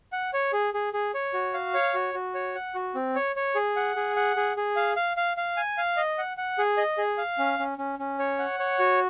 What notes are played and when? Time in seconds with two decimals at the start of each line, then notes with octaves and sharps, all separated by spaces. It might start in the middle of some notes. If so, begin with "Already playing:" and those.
0.12 F#5
0.33 C#5
0.53 G#4
0.74 G#4
0.93 G#4
1.14 C#5
1.34 F#4
1.54 F5
1.74 C#5
1.94 F#4
2.14 F#4
2.35 C#5
2.55 F#5
2.75 F#4
2.95 C4
3.15 C#5
3.36 C#5
3.55 G#4
3.76 F#5
3.96 G#4
4.16 F#5
4.36 G#4
4.57 G#4
4.76 F5
4.96 F5
5.17 F5
5.37 F5
5.57 G#5
5.77 F5
5.97 D#5
6.18 F#5
6.37 F#5
6.58 G#4
6.77 D#5
6.98 G#4
7.18 F5
7.38 C#4
7.59 C#4
7.78 C#4
7.99 C#4
8.19 C#5
8.39 F#5
8.60 C#5
8.79 F#4